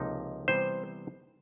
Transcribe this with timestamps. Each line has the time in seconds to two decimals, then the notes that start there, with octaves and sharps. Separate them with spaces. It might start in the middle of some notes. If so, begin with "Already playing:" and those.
Already playing: C#2 C3 F3 A#3 D#4
0.48 C3 E3 G3 B3 C5